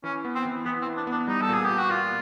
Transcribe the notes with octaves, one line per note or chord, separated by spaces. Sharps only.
E3 C#4
B3
C4
E3
E3 B3
C4
E3
D4
B3 D4
G3 D#4
A4
A#2 G#4
A#2 G4
F#4
A#2 F4